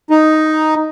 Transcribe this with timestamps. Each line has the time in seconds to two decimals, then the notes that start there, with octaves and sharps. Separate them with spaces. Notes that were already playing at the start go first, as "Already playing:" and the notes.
0.10 D#4